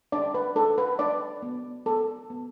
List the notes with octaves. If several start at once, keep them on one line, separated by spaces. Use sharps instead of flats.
D4 D5
B4
D4 A4
B4
D4 D5
B3
B3 A4
B3